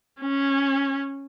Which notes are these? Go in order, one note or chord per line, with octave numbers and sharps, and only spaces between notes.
C#4